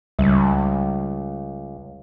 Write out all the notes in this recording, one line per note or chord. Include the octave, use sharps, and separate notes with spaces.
C#2 G3